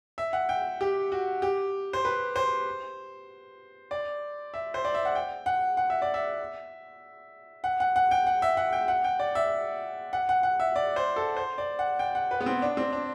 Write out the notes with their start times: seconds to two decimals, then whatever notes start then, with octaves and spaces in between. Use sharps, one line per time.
0.18 E5
0.33 F#5
0.49 G5
0.81 G4
1.12 F#4
1.42 G4
1.93 C5
2.05 B4
2.36 C5
3.91 D5
4.54 E5
4.74 C5
4.85 D5
4.94 E5
5.05 F#5
5.15 G5
5.46 F#5
5.77 F#5
5.90 E5
6.02 D5
6.14 E5
7.64 F#5
7.80 F#5
7.96 F#5
8.11 G5
8.27 F#5
8.42 E5
8.57 F#5
8.73 G5
8.88 F#5
9.04 G5
9.19 D5
9.35 E5
10.13 F#5
10.29 F#5
10.43 F#5
10.60 E5
10.76 D5
10.96 C5
11.16 A4
11.37 C5
11.58 D5
11.79 F#5
11.99 G5
12.15 F#5
12.31 B4
12.41 B3
12.46 C4
12.62 D4
12.77 C4
12.93 D4